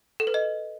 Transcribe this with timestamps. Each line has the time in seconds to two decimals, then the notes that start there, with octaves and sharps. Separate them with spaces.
0.20 A4
0.27 B4
0.34 D#5